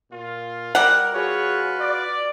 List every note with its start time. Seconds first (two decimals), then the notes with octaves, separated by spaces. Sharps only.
0.11 A#2 F4
0.75 G3 A#4 F#5
1.14 F4 F#4 G#4 B4 C#5
1.79 D5